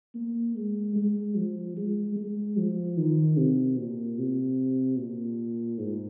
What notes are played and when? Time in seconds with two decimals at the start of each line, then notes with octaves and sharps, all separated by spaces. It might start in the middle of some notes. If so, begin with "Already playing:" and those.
0.15 A#3
0.56 G#3
0.96 G#3
1.36 F3
1.77 G#3
2.16 G#3
2.57 F3
2.98 D#3
3.37 C3
3.78 A#2
4.19 C3
4.98 A#2
5.79 G#2